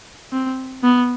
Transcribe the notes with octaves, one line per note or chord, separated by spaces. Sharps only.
C4
B3